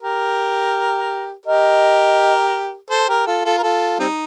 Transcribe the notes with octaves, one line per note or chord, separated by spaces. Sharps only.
G4 A#4
G4 A#4 D#5
A4 C5
G4 A#4
F4 A4
F4 A4
A#4
F4 A4
G3 C4 D#4